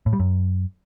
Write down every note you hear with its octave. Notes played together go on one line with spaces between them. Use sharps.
A2
G3
F#2